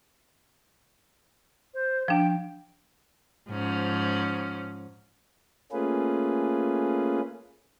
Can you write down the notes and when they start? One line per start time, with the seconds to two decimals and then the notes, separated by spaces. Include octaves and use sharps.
1.74 C5
2.08 F3 D4 G5
3.50 G#2 F3 C#4
5.72 A3 A#3 C#4 F4 G#4 B4